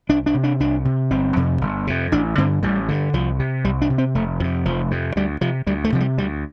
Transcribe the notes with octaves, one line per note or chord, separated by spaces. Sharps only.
C2 D4
D4
C3
D4
C2 D4
C3
G1 C4
F2 C3
G1
F2 C3
A1 D4
G2 D3 C4
A1 G3
G2 D3
C2 F3
C3
C2 G3
D4
C3
C4
F1 A3
F2 C3 F3
F1 F3
F2 C3
D2 G3
C3 F3
D2 G3
A3
C3 F3
G3
D2 G3